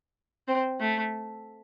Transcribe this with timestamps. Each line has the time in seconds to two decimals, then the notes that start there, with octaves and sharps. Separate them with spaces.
0.48 C4
0.80 A3